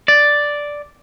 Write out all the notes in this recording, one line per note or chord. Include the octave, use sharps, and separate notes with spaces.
D5